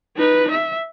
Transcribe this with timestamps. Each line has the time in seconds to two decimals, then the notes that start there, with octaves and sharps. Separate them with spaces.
0.17 D#4 B4
0.51 E5